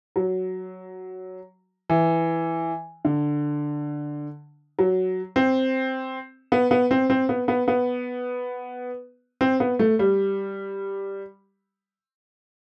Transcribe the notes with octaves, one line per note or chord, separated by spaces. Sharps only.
F#3
E3
D3
F#3
C4
B3
B3
C4
C4
B3
B3
B3
C4
B3
A3
G3